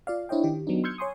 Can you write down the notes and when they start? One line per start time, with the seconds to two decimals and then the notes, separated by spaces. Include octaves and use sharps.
0.07 F4 D5 F5
0.29 D4 E4 C5 C#5 D#5 G5
0.44 D#3 G4
0.67 F#3 B3 D4 D#4
0.84 C6 E6 F6 G6 G#6 C#7
0.98 C#5 G#5 C6 C#6 D#6